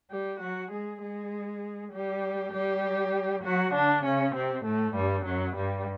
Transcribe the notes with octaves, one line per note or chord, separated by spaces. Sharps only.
G3 G4
F#3 F#4
G#3 G#4
G#3 G#4
G3 G4
G3 G4
F#3 F#4
D3 D4
C#3 C#4
C3 C4
A2 A3
G2 G3
F#2 F#3
G2 G3